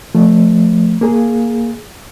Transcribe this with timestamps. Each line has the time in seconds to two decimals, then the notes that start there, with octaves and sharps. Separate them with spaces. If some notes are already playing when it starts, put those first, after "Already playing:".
0.15 F3 A3
1.01 A#3 G#4